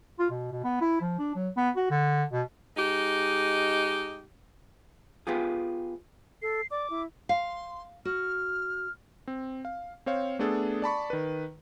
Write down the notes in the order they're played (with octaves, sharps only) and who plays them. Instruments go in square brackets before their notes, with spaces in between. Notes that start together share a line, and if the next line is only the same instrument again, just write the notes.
[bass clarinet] F4
B2
B2
B3
E4
F3
D4
F#3
B3
F#4
D3
B2
[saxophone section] G#3 D#4 G4
[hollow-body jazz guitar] B3 F4 G4 G#4
[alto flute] A4 [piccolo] C7
[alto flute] D5 [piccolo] D6
[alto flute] E4
[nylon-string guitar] F5 [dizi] C6
[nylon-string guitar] F#4 [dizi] F6
[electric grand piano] C4
F5
C4 C5 C#5 F5
A3 B3 D4 G#4 A4
D5 A5 B5 C#6
D#3 B4